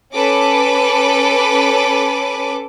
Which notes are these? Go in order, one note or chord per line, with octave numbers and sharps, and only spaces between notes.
C#4 A4 B4 D6